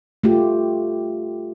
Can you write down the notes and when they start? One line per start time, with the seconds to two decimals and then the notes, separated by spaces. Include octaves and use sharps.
0.24 A3 F4 G4